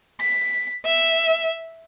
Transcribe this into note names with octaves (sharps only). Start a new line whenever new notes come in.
B6
E5